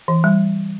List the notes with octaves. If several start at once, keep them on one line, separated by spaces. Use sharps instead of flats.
E3
G3